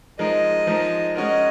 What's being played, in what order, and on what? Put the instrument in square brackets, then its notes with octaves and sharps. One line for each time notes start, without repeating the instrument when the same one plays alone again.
[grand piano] F3 G#3 D#4 A#4 [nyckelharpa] D#5
[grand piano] F3 G#3 D#4 A#4
[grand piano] G#3 C#4 F#4 A#4 [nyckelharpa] D#5